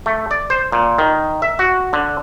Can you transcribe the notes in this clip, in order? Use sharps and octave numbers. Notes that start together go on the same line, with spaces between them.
A3
D5
C5
A#2
D#3
E5
F#4
D3